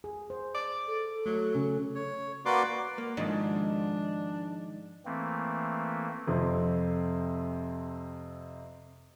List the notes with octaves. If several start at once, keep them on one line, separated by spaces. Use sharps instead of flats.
G#4
C5
D5
A4
F#3 A3
C#3 C#4
C#5
A#3 F#4 B4 D5 C6 D6
A#3
G#2 D#3 F3 D4
E3 A3 A#3 C4
F2 C3 C4